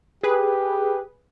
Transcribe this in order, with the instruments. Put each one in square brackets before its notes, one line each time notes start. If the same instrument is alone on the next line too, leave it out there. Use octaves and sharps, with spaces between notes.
[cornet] G4 [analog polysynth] G#4 B4